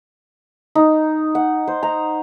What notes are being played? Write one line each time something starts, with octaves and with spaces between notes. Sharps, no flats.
D#4
F#5
C5
A#5